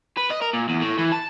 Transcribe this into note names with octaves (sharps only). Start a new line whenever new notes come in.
B4
D#5
A#4
A#2
E2
A2
E3
A5